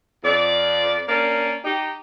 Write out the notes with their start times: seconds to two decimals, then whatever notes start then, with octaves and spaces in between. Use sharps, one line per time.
0.24 F2 D5
1.08 A#3 C#4 D4 A#4 D5
1.64 D#4 G4